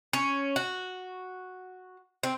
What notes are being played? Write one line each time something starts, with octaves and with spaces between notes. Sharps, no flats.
C#4
F#4
C4